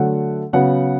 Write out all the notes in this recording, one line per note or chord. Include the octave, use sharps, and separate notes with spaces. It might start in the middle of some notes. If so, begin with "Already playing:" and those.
Already playing: D3 F#3 A3 F#5
C#3 F#3 B3 F#5